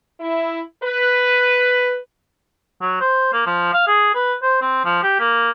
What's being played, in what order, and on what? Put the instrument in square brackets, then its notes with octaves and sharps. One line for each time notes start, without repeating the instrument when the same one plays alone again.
[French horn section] E4
B4
[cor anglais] F#3
C5
A#3
F3
F5
G#4
B4
C5
C4
F3
G4
A#3